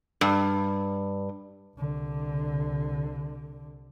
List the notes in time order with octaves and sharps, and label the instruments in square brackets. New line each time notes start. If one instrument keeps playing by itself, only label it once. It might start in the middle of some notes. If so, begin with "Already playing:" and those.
[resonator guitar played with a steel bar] G2
[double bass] C2 D3